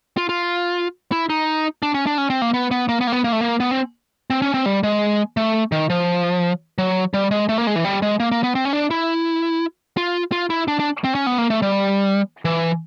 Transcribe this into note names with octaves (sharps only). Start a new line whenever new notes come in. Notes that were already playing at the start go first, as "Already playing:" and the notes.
F4
F4
E4
D#4
D4
C#4
D4
C#4
C4
A#3
B3
B3
A#3
B3
A#3
B3
A#3
A3
A#3
B3
C4
C4
C#4
C4
G3
G#3
A3
D#3
F3
F#3
G3
G#3
A3
A#3
G#3
E3
G3
G#3
A#3
A#3
B3
C4
C#4
D4
E4
F4
F4
E4
D4
D4
C4
C#4
B3
A#3
A3
G3
E3